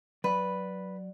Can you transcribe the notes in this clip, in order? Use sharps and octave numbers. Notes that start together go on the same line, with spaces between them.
F#3 B4 D5